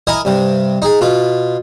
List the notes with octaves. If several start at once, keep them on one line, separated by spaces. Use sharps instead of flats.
E4 A#4 D#5 G#5
G2 C3
D#4 G#4
B2 F4